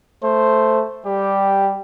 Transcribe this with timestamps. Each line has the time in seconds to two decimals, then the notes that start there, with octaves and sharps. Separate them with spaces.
0.23 A3 C5
1.06 G3 G4